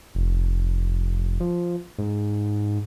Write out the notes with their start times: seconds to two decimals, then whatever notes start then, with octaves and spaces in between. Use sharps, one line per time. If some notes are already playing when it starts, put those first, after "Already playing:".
0.15 F1
1.40 F3
1.98 G#2